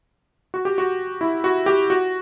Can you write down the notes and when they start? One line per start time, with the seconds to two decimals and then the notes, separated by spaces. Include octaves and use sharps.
0.54 F#4
0.65 G4
0.78 F#4
1.21 E4
1.44 F#4
1.66 G4
1.90 F#4